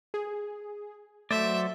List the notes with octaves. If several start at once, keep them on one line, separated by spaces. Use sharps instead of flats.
G#4
F#3 A3 C5 D5 E5